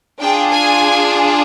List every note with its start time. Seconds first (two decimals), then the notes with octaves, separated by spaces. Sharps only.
0.20 D4 F4 G#4 G5
0.50 G#5